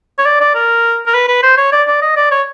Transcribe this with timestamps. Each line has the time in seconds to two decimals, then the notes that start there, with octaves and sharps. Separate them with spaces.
0.18 C#5
0.25 D5
0.40 D5
0.55 A#4
1.06 A#4
1.14 B4
1.28 B4
1.43 C5
1.57 C#5
1.72 D5
1.87 D5
2.02 D#5
2.16 D5
2.31 C#5